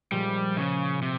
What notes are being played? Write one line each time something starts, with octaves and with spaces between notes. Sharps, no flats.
A#2 F3 G3 G#3
C#3
C3